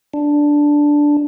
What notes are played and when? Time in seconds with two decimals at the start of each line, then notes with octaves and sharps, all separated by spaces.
0.14 D4